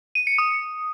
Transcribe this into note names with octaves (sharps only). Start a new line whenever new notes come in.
D#7
C#7
D#6